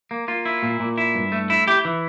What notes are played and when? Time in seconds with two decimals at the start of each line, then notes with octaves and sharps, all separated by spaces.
0.11 A#3
0.28 A#3 F4
0.46 E4
0.63 A#2
0.80 A#2
0.98 E4
1.15 G2
1.32 A3
1.50 E4
1.68 E4 G4
1.85 E3